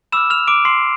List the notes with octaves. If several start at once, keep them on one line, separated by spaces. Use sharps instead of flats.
B5 D6 E6 F6 E7
F6 F7
D6 D7
C6 C7